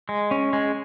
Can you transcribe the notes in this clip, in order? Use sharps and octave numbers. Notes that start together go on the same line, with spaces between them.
G#3
C#4
G#3